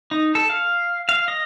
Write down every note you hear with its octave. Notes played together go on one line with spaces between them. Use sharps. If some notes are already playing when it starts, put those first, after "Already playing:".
D#4
A4
F5
F5
D#5